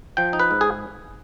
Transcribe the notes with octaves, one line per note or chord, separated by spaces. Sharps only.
F3 G5
D#4
B4
G#2
G#4